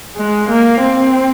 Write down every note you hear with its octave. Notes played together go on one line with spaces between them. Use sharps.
G#3
A#3
C4